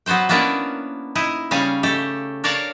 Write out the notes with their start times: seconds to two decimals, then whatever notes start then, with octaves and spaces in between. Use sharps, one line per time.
0.06 F#3 B3 F#4 C5 G5
0.29 A#3 B3 C#4 D4 E4 A#4
1.15 D#4 E4 D#5
1.51 C#3 G3 C#4 F5 G#5
1.83 A3 G4 A4
2.44 D4 A#4 C#5 D5 F5 A#5